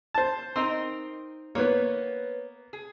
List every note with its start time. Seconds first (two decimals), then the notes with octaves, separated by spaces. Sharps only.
0.14 C5 A5
0.56 C4 D#4 A#4 C6
1.55 A#3 B3 B4 C#5
2.73 G#4